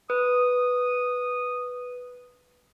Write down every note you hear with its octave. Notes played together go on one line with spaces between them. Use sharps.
B4 D#6